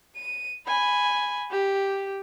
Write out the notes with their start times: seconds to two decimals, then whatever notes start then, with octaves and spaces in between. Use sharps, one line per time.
0.16 D#7
0.67 G#5 B5
1.51 G4